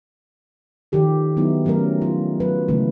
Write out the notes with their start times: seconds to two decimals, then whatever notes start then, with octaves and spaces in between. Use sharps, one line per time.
0.92 D#3 F3 G4 A4
1.37 F#3 B3 D#4 E4
1.65 F3 F#3 A3 C#4 A#4
2.02 F4
2.40 F#3 B4
2.68 C#3 E3 F#3 G#3 A3 C#4